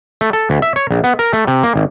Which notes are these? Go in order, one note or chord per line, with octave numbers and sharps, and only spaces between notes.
A3
A4
D2
E5
C#5
A#1
B3
A#4
A3
C3
A#3
G#1